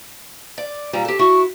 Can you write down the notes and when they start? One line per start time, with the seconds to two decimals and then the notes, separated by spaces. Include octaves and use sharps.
0.58 D5
0.93 A#2 G3 A#5
1.05 G4 A4
1.19 E4 F#4 C#6